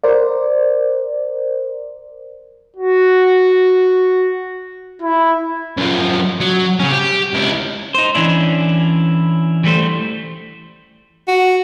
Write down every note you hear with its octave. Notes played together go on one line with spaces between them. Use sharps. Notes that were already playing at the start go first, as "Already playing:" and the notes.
A#4 C5 D5
F#4
E4
F#2 F3
F#3
C#3 C#4
G4
C#2 E4
D#4 C5
E3 C#4 D4 E4
E3 G3 A3 C5
F#4